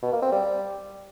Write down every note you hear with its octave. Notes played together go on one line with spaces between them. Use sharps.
B2
A#3
C4
G3